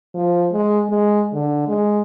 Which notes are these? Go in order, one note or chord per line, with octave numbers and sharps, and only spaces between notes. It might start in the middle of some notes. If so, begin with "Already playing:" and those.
F3
G#3
G#3
D3
G#3